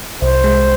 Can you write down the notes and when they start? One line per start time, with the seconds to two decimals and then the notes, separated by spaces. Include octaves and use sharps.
0.22 C2 C5
0.44 G#3